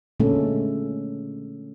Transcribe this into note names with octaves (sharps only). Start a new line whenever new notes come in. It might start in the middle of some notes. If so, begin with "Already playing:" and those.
A#2 D3 G#3 A3 C#4 A4